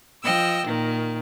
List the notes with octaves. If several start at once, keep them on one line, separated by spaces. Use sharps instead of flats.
F3 D#5 G5 E6
A#2 D#3